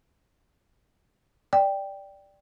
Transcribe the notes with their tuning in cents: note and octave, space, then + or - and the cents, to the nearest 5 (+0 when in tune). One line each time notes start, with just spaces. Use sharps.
D5 +0 G5 +0